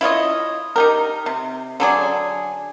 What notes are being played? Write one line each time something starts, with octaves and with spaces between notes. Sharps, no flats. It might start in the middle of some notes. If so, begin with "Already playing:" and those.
E4 F4 C#5 D#5
D#4 G4 A#4
C3
D3 F#3 G#4 D5